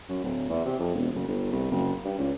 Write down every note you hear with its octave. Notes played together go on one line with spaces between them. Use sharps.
F#2
D1
E2
C3
F2
E1
F#1
G1
C2
F#1
G2
C#2